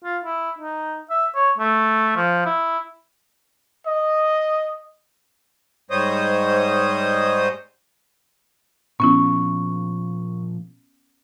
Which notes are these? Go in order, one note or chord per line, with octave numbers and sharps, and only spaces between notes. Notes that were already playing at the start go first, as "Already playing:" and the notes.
F4
E4
D#4
E5
C#5
A3
F3
E4
D#5
G#2 G3 C5 C#5 D#5 D#6
A#2 F3 B3 C#4 E4 C#6